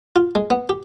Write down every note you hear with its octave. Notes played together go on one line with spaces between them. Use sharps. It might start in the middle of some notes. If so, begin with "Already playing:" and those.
F4
G#3
B3
G4